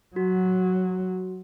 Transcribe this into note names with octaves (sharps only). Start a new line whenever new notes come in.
F#3 F#4